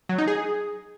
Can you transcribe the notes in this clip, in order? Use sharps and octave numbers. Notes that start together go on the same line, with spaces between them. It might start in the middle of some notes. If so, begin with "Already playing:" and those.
F#3
D#4
G#4